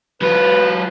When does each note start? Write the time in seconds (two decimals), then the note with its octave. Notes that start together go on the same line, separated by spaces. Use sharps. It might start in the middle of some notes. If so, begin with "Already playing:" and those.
0.22 F#3 F4 B4